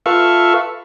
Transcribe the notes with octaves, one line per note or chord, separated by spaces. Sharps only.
F4 A4 B4 E5 F5 C#6